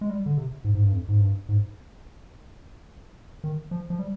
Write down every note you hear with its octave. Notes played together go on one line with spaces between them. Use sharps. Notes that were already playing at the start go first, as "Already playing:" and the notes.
G#3
G3
D3
C3
G#2
G#2
G2
F2
G#2
G2
G#2
D#3
F3
F3
G3